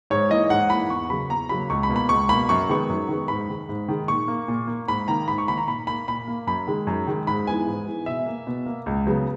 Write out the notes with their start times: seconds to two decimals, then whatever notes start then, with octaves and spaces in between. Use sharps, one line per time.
0.10 G#2 C#5
0.30 E3 A#3 D#5
0.50 G#2 F#5
0.70 E3 A#3 B5
0.90 E2 C#6
1.09 C#3 F#3 A#3 B5
1.29 E2 A#5
1.49 C#3 F#3 A#3 B5
1.70 C#2 C#6
1.83 B5
1.89 B2 A#3
1.96 B5
2.09 C#2 C#6
2.29 B2 A#3 B5
2.49 F#2 C#6
2.69 D#3 G#3 B3 C#6
2.89 F#2
3.08 D#3 G#3 B3
3.28 G#2 B5
3.49 D#3 G#3
3.69 G#2
3.88 D#3 G#3
4.08 A#2 C#6
4.28 A#3
4.48 A#2
4.68 A#3
4.88 G#2 B5
5.08 D#3 A#3 A#5
5.28 G#2 B5
5.38 C#6
5.48 D#3 A#3 B5
5.57 A#5
5.67 A#2 B5
5.87 A#3 B5
6.07 A#2 B5
6.28 A#3
6.47 F#2 B5
6.67 D#3 G#3
6.87 F#2
7.07 D#3 G#3
7.27 G#2 B5
7.47 E3 G#3 B3 G#5
7.67 G#2
7.87 E3 G#3 B3
8.06 B2 E5
8.26 A#3
8.47 B2
8.66 A#3
8.86 C#2
9.06 C#3 F#3 B3